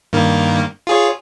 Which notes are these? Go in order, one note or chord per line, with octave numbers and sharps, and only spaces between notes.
G2 D#3 A#3
F4 G#4 C#5